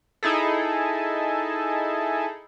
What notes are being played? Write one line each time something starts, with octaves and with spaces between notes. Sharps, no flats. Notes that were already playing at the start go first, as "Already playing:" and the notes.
D#4 E4 G#4 A4